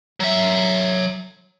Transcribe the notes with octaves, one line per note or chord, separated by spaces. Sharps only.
F#3 E5